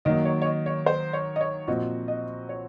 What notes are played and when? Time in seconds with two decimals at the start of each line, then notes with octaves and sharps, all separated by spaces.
0.05 D#3 F#3 A#3 D#5
0.25 C#5
0.42 C#5
0.46 D#5
0.66 C#5
0.86 C5
1.13 C#5
1.36 D#5
1.41 C#5
1.67 A#2 F3 C4 F#4 D#5
2.08 D#5
2.49 C#5